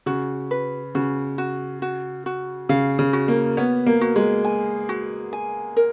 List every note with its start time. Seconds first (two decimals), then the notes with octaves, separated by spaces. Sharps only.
0.06 C#3 F#4
0.51 B4
0.95 C#3 F#4
1.38 F#4
1.82 F#4
2.26 F#4
2.69 C#3 F5
2.99 C#3
3.13 F#4
3.28 A#3
3.57 B3 C#5
3.86 A#3
4.01 F#4
4.16 G#3
4.45 G#5
4.89 F#4
5.33 G#5
5.77 A#4